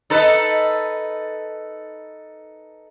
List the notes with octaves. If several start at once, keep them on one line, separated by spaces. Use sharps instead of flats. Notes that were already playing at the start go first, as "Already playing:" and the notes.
D#4 A4 B4